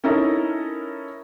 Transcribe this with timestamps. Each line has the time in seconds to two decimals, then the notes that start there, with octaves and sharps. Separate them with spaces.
0.04 C#4 D#4 E4 A4 A#4